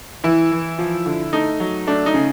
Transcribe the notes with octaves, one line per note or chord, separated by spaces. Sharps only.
E3 E4
E3
F3
D3
A3 D#4
F#3
A3 D4
D#4
C#3